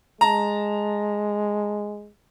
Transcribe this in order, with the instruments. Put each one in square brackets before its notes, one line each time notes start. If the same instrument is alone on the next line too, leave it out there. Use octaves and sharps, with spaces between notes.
[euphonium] G#3 [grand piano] A5 A#5